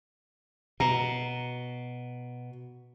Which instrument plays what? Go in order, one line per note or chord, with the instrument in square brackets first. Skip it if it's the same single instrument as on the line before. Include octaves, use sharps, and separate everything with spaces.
[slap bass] B2 [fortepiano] A#5